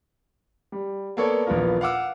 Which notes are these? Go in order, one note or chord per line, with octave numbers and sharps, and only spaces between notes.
G3
A#3 B3 A4 C#5 D5
A#1 E3 B3 F4 A#4
F5 F#5 D6 E6